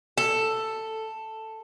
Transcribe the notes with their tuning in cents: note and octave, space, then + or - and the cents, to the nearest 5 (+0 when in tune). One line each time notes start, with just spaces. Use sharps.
A4 +5